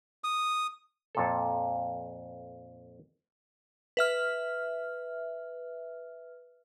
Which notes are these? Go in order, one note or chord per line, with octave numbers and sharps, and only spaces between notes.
D#6
F2 A#2 A4
B4 E5 F6